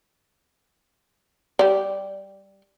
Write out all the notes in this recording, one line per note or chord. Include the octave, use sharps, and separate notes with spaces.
G3 D5